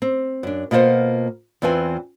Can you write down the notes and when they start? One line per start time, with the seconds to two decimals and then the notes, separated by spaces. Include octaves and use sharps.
0.02 C4
0.43 F#2 D4
0.71 B2 A#3 F4 A4 C5 F#5
1.62 E2 E3 C4 F4 B4 G#5